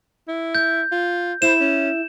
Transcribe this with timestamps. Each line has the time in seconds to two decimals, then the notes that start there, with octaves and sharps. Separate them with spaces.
0.28 E4
0.55 G6
0.92 F4
1.42 E4 C5 E7
1.60 C#4